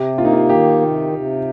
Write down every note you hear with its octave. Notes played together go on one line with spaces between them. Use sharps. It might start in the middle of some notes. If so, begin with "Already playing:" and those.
Already playing: C3 G4
A#3 F4
D#4
F4
D#3 G4
C3
C3